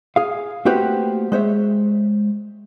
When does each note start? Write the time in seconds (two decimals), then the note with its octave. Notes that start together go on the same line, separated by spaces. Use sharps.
0.16 G#4 F5
0.65 A3 A#3 C4 F#4 G4 B4
1.32 G#3 C5 C#5 E5